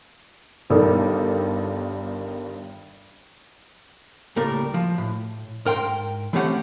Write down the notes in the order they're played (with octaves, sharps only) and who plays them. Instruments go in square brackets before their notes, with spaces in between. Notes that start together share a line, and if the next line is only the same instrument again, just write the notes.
[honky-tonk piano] G1 G2 D#3 A4 D5
[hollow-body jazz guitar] C#2 A2 G3 A#3 A#4
F3
A2
G#2 A#4 G5 C6
E3 A3 C4 C#4 G4 F#5